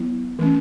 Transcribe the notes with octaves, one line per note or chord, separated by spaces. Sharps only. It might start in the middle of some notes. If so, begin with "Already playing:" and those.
Already playing: F#3 B3 E4
E3 A3 C#4